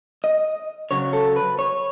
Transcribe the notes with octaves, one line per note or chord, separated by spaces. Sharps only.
D#5
C#3 F#3 C#5
A4
B4
C#5